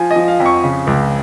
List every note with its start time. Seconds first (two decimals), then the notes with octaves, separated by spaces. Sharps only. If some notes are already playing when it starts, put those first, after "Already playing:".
Already playing: F3 G#5
0.11 D#5
0.16 F3
0.28 F5
0.40 F2
0.46 C#6
0.64 C#3
0.87 C#2